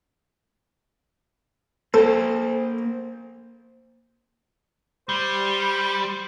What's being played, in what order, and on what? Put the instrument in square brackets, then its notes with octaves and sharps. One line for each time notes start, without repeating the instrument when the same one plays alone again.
[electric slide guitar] A#3 C5 [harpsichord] A4
[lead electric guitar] G3 [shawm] C5